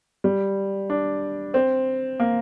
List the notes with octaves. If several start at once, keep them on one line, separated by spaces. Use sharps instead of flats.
G3
D4
C4
A#3